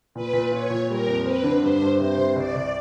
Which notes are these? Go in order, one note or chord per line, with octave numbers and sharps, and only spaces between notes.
A#2 B4
A#2
F4 C#5
A#2
G3 A#4
F2
C4 B4
D3
G2 C5
G2
C3 C5
C3
C2 D5
C2